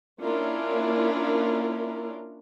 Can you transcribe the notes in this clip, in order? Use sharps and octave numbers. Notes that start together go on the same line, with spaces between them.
A#3 C#4 D4 E4 F4 A#4